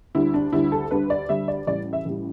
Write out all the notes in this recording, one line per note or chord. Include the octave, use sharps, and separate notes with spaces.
D2 D3 G3 E4
D4
D2 D3 G3 E4
A4
D2 D3 G3 B4
D5
D2 D3 G3 E5
D5
A1 A2 G3 D5
E5
A1 A2 G3